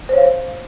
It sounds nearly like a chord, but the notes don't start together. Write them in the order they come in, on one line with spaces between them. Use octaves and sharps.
C5 C#5 F5